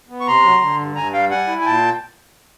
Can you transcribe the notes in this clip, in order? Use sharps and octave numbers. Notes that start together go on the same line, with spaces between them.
B3
C#6
C3 A#5 C6
F#3
D3
G2
G2 G#5 A#5
G3 F5 G5
G3 F#5 G#5
E4
G#5
A#2 G5 A5